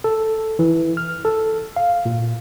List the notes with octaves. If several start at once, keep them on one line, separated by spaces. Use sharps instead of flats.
A4
E3
F6
A4
F5
A#2